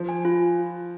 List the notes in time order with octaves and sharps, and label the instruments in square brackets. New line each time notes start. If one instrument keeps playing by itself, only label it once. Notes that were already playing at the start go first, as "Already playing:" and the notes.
Already playing: [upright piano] F3
[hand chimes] G#5
F4